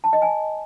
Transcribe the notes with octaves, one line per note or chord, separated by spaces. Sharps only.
A5
D#5
G#5